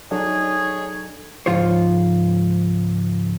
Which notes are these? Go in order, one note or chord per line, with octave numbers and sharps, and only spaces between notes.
F#3 D4 D#4 G#4 A4 C#5
C#2 G#2 F3 F4 C5 C#5